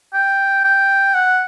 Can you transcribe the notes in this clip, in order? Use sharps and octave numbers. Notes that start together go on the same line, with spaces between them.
G5
G5
F#5